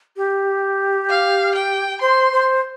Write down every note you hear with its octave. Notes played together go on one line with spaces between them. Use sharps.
G4
F5
G5
C5 C6
C5